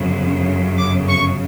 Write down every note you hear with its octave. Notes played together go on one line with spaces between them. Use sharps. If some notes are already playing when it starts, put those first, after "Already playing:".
Already playing: G1 F#2 C#3
D6
C#6